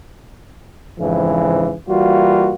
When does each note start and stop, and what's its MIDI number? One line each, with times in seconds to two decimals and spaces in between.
1.00 1.74 41
1.00 1.74 44
1.00 1.74 49
1.00 1.74 52
1.89 2.55 52
1.89 2.55 55
1.89 2.55 58
1.89 2.55 65
1.89 2.55 66